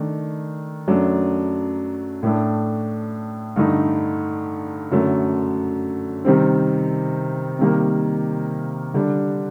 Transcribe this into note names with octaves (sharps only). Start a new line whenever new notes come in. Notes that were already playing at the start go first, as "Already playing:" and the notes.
Already playing: D#3 A3 D4
F#2 F#3 A3 D4
A2 A3 D4
G2 D3 A3 D#4
F#2 D3 F#3 A3
C3 D#3 G3 C4
C3 D#3 G3 A#3
D3 G3 D4